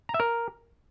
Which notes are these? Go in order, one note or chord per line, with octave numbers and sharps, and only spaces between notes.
A#5
E5
A#4